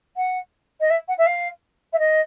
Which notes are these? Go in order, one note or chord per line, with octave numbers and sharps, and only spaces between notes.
F#5
D#5
E5
F#5
E5
F5
E5
D#5